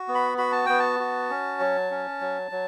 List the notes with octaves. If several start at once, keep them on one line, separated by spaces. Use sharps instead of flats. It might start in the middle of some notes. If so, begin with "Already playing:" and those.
Already playing: F#4
B3
B5
F#4 B5
A5
B3 G5
A5
F#4
C#4
F#3
C#4
F#3
F#3